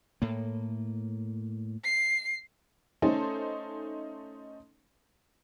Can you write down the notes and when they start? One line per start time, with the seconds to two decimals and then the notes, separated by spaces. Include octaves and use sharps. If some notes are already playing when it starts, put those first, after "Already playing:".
0.22 A2 A#3
1.84 C7
3.02 A3 C#4 D#4 A4 C5